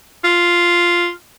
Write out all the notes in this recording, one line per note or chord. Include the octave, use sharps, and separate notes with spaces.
F4